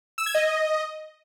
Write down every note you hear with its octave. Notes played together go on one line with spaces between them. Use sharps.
E6
G#6
D#5